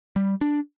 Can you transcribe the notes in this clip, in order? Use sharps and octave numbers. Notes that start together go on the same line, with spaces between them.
G3
D4